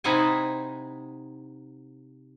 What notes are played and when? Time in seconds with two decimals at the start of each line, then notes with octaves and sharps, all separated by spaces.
0.04 C3 D#4 E4 C5 F#5 G#5